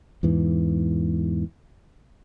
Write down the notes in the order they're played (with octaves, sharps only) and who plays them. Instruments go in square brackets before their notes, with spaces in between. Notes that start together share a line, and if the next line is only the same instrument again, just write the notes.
[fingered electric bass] E2 G#2 E3